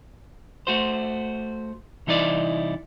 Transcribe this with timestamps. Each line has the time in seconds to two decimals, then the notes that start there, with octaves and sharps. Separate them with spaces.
0.67 A3 F#4 C5
2.07 C2 E3 D#4 E4 D5